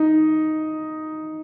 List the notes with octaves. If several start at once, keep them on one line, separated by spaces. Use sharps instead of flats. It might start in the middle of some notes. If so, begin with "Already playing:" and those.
Already playing: D#4